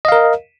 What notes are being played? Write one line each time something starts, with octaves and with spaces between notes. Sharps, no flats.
A#4 D#5 F5